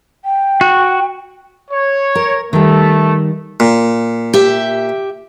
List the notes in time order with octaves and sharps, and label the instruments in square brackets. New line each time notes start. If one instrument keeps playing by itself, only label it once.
[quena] G5
[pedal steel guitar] F#4
[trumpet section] C#5
[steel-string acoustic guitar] A#4
[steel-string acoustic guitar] D#3 G3 [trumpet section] A3
[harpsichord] A#2
[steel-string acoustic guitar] G4 E5